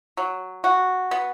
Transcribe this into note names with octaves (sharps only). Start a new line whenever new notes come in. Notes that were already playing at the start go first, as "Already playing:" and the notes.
F#3
F#4
B3